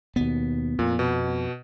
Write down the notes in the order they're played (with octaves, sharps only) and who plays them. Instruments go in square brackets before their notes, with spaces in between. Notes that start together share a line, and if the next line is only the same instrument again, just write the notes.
[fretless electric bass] D#2 B2 [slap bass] B3
[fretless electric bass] F2 [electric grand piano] A#2
[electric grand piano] B2